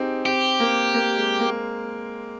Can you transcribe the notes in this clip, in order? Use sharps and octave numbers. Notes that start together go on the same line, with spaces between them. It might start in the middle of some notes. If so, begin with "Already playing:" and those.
Already playing: C4 D#4 G4 G#4
C4 G4
A#3
A#3
G#3
A#3